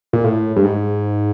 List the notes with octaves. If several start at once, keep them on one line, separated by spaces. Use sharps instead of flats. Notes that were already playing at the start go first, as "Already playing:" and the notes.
A#2
A2
G2
G#2